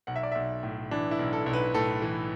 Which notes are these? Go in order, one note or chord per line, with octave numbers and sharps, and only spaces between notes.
B1 F#5
E5
D5
B1 E5
A2
E3 D4
E4
B1
A4
B1
B4
A2 A4
E3